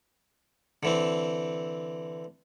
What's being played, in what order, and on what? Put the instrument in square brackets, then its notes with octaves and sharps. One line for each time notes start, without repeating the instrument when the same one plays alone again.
[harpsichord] D3 E3 C4